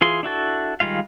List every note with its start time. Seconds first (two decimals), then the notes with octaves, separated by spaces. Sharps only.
0.01 E3 F4 G#4 C6
0.23 D4 E4 F#4 A4
0.80 D#3 G3 G#3 F4 F5